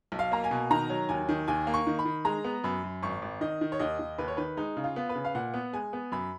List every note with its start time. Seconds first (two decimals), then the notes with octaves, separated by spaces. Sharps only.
0.12 B1
0.19 F5
0.32 A#3 A#5
0.44 G#5
0.51 B2
0.70 D#3 A#5
0.90 F#3
1.09 D#2 G#5
1.29 D#3
1.48 D#2 G#5
1.67 A#3
1.74 C#6
1.87 D#3
1.99 B5
2.05 D#3
2.25 G#3 A#5
2.44 B3
2.64 F#2 B5
2.83 F#2
3.03 G#1 C#6
3.22 G#1
3.41 D#3 D#5
3.61 D#3
3.72 C#5
3.79 D#2 D#5
3.99 D#2
4.18 D#2 B4
4.28 C#5
4.37 D#3 B4
4.57 G#3 D#4
4.77 C#3
4.84 F4
4.96 B3
5.09 B4
5.15 C#3
5.24 F5
5.35 A#2 F#5
5.54 B3
5.73 G#3 G#5
5.93 B3
6.12 F#2 B5